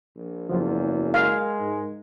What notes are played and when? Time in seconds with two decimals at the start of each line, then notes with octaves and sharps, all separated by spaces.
0.16 A#1
0.49 F#1 E2 F3 F#3 F4
1.14 G#3 A#4 F5 G#6
1.59 G#2